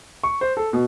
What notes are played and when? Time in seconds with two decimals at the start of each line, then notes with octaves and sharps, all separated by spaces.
0.24 C#6
0.41 C5
0.57 A4
0.73 B2